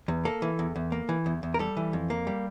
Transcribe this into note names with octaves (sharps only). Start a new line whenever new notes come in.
E2
A#3 A4
E3
E2
E2
A#3
E3
E2
E2
A#4
G3 A4
E3
F2
A#3
G3